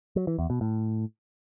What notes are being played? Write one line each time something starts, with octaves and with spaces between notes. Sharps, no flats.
F#3
E3
E2
B2
A2